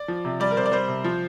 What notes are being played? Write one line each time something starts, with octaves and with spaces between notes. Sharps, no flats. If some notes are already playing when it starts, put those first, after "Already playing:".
Already playing: D5
F3
C3
G3 D5
A#4
C3 C5
D5
G3 C5
C3
F3